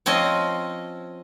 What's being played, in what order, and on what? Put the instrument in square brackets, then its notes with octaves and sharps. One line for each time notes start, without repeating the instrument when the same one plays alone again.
[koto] F3 C4 C#4 D#5